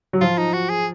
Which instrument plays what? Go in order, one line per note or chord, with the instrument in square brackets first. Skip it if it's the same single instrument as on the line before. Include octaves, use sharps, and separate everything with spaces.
[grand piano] F#3
[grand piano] F3 [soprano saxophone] F4
[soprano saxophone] D#4
F#4
G#4